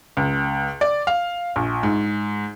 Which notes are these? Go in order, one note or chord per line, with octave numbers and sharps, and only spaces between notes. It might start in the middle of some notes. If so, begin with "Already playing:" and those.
C#2
D5
F5
A#1
G#2